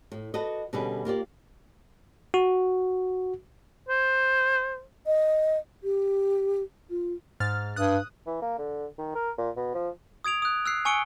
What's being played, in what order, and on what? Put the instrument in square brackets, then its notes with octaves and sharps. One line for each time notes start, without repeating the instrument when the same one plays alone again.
[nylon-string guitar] A2
F#4 A4 B4 D5 D#5
B2 D3 G3 C#4 G#4 B4
A#3 F4 G4 D5
[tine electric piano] F#4
[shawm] C5
[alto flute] D#5
G4
F4
[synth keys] G#2 F6 A6
[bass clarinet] G2 [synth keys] D#6 F#6
[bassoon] E3
A#3
D3
D#3
A#4
A#2
B2
F3
[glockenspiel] D#6 G#6 D7 F7
D#6 F#6
E6 F#6 C7
G#5 C#6 E6 C#7 D7 G7